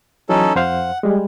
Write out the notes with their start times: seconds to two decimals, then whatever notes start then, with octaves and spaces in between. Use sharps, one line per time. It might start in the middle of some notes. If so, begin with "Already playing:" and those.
0.29 E3 F#3 C#4 D#4 A4
0.56 F2 C5 F5 F#5
1.03 G3 G#3